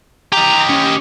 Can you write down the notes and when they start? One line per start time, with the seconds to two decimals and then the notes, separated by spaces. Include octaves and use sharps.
0.33 G4 D#5 A#5
0.69 C#4